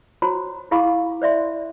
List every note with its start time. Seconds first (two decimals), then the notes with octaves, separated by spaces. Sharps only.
0.22 F#4 C5 C#5 A#5 B5
0.71 E4 G#4 F5 B5 C#6 D6
1.22 C5 D5 E5 C6